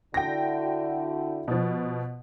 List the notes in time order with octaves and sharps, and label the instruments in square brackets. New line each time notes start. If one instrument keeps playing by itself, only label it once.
[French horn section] D3 E4 F#4 [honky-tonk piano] G5 A#6
[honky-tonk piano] B2 F3